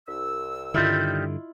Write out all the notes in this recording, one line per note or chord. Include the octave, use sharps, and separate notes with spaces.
C2 E6
G2 D3 D#3 G3 E4 F4 D#5